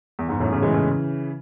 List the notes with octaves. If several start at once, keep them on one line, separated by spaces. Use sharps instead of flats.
E2
E2 G#2
F#2 A2
C#3 E3
E3 G#3
C#3 E3